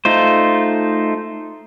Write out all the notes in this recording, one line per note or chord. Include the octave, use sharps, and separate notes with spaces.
A3 D#4 F4 C5